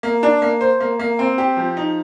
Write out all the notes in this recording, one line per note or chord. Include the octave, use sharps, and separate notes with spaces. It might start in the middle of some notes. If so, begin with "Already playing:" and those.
A#3
D4
A#3
C5
A#3
A#3
C4
G4
F3
D#4